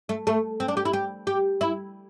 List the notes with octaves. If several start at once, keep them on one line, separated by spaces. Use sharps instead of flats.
A3
A3
C4
D4
G4
E4
G4
G4
E4